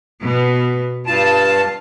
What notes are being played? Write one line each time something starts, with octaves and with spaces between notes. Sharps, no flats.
B2 B3
G2 F4 A5